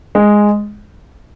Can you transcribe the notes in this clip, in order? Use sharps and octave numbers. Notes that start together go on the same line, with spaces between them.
G#3